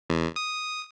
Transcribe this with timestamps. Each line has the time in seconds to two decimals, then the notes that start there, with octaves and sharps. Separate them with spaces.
0.10 E2
0.36 D#6